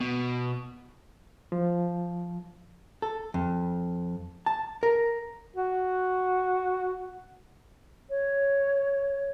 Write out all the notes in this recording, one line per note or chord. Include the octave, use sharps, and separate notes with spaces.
B2
F3
A4
F2
A5
A#4
F#4
C#5